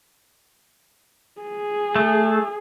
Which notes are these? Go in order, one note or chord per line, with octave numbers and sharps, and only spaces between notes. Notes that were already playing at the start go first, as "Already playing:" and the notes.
G#4
A3